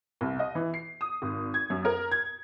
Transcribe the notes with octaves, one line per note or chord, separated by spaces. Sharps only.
C2
D#5
E3
C7
D#6
G#1
G#6
F#2
A#4
G#6